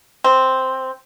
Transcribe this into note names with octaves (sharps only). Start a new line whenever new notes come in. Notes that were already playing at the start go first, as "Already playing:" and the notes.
C4